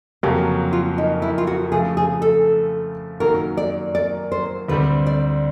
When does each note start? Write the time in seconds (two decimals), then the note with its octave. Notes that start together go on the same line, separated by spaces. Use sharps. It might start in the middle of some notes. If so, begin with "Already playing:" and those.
0.23 F2 C#3 F#3 A#3 C#4 G4
0.73 F4
0.98 D#4
1.22 E4
1.38 F4
1.47 F#4
1.72 C#3 F3 A3 G#4
1.97 G#4
2.22 A4
3.20 F#2 D#3 F#3 A#3 A#4
3.57 D5
3.95 D5
4.32 C5
4.68 D2 D3 G3 C4 B4
5.06 D5